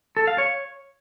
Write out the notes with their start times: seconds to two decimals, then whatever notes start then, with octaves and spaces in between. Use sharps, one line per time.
0.17 A4
0.27 F5
0.38 C#5